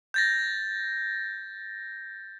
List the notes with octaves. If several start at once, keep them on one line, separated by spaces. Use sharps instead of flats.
G6 A6 A#6